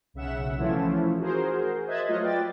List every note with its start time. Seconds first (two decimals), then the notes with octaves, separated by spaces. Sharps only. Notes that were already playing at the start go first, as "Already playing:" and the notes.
0.14 B1 C#3 E5 F#5 E7
0.58 E3 F3 A3 C#4 E4 F4
1.19 F#4 G#4 A#4 C5
1.86 C5 D#5 E5 F#6 G#6 A6
2.08 F#3 A3 F4 D#5 F5 F#5
2.22 B4 D5 G5 A6